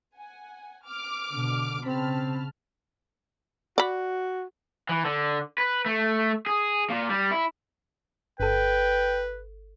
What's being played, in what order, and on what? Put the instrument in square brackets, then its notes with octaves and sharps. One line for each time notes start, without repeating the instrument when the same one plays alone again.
[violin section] F#5 G#5
D6 F6
[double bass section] B2 D3
[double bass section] C#3 [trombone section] C4 [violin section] A5 B5 F6
[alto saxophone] F#4 [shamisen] D5 B5
[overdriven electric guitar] E3
D3
B4
A3
G#4
A#2
G3
E4
[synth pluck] G1 A4 [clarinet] B4 [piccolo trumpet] G5